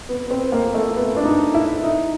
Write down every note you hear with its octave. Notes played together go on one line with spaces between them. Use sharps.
B3
B3
C4
A#3
A3
B3
D4
D#4
E4
D#4